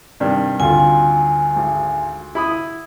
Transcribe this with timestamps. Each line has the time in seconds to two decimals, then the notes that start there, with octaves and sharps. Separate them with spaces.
0.20 G2 C3 D#3 D4
0.60 D2 F4 G#5
1.56 G#1
2.35 E4 B5 D#6